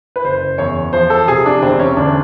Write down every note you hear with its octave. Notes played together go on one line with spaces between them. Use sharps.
B4
F#1 C5
E2 C#5
F3 C5
A4
C3 G#4
D4
E1 C4
C#4
D2 D4